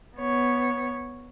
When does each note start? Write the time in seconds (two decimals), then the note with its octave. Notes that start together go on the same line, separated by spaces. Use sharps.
0.16 B3 C#5